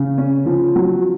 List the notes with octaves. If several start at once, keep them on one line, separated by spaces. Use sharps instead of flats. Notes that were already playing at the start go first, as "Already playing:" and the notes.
Already playing: C#3
C#4
F3
F#3